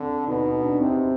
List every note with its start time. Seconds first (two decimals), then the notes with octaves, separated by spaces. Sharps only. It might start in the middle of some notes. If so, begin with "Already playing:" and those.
Already playing: D3 C4
0.28 B2 D#4
0.45 D#4
0.63 D4
0.80 C3 C4